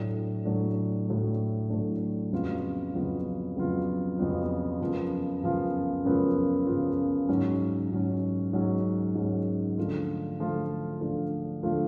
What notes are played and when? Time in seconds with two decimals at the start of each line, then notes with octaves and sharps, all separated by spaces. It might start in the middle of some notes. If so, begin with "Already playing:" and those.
Already playing: A2 F#3 A3 D4
0.45 A2 F#3 A3 D4
1.08 A2 F#3 A3 D4
1.70 A2 F#3 A3 D4
2.33 F2 C#3 F#3 B3 F4
2.94 F2 C#3 F#3 B3 F4
3.56 F2 C#3 F#3 B3 F4
4.18 F2 C#3 F#3 B3 F4
4.80 F#2 C#3 F3 B3 F4
5.42 F#2 C#3 F3 B3 F4
6.05 F#2 C#3 F3 B3 F4
6.66 F#2 C#3 F3 B3 F4
7.29 G#2 F#3 C#4
7.92 G#2 F#3 C#4
8.53 G#2 F#3 C#4
9.15 G#2 F#3 C#4
9.78 D3 F3 A3 F4
10.40 D3 F3 A3 F4
11.01 D3 F3 A3 F4
11.63 D3 F3 A3 F4